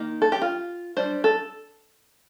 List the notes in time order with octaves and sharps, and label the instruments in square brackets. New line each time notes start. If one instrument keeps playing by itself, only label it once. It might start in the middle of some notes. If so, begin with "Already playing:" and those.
Already playing: [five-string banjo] D#3 A#3 D#4
A4
G4
F4
G3 D4 C5
A4